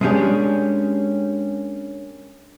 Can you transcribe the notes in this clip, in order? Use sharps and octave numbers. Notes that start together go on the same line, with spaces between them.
G#3 A#3 C#4 D4 G4 G#4